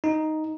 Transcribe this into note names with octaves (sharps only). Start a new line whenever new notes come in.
D#4